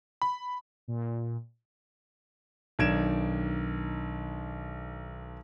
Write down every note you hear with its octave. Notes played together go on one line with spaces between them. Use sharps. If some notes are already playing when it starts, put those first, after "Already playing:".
B5
A#2
B1 D#3 D4 G#6 D7 E7